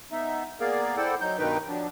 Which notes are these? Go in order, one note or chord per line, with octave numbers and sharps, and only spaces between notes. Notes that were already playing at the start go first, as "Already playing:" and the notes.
B3 D#4 E5
A#3 B3 G#4 A#4 D5 F5
E4 A4 C5 D5 F#5 G5
F#3 D#4 G6
G2 B2 D#3 D#4 B4 G5
F3 F#3 D4